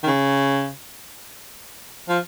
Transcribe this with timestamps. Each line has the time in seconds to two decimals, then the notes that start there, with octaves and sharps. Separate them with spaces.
0.03 D#3
0.07 C#3
2.09 F3